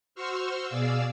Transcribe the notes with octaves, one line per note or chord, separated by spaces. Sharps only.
F#4 C5 C6 C#6 E6 F6
B2 G#4 D5 F5 E6